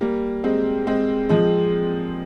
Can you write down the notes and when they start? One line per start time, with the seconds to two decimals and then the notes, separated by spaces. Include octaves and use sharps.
0.01 G3 A#3
0.44 G#3 C4
0.87 G#3 C4
1.29 F3 G#3